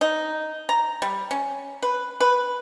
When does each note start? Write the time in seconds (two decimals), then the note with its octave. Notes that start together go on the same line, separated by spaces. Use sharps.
0.01 D#4
0.69 A#5
1.02 G3
1.31 C#4
1.82 B4
2.20 B4